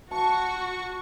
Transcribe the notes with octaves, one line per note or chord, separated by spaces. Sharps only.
F#4 A5 C#6